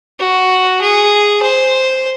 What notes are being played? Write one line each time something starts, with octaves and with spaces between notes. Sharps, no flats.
F#4
G#4
C5